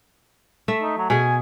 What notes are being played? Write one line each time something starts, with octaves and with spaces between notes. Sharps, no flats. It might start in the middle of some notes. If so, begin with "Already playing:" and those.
A3 E5
D#4
F#3
B2 G#4 G#5